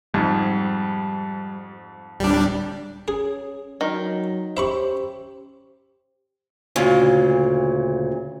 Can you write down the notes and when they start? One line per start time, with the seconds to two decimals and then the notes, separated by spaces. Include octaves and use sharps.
0.14 F2 G#2 G3
2.20 D1 G3 D4
3.08 C#4 G#4
3.81 D#3 F#3
4.57 C#4 G4 C5 E5 B5 C#6
6.76 D2 A#2 C#3